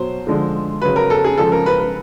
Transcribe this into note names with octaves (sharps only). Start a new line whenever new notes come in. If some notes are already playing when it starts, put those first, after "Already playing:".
Already playing: B2 F#3 C5
D3 F3 G#3
C#3 F#3 B4
A#4
A4
G#4
C#3 F3 G#3 A4
A#4
B4
B4